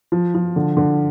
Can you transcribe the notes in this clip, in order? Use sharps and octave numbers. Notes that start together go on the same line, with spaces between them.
F3
F3
D3
D3